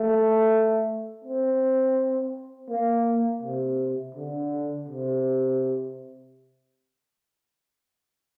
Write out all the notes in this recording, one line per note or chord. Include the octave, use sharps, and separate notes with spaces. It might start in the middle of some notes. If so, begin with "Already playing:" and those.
Already playing: A3
C4
A#3
C3
D3
C3